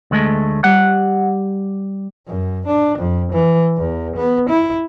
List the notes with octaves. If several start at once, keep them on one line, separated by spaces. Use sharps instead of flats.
D2 G#3 A3
G3 F#5
F#2
D4
F2
E3
E2
B3
E4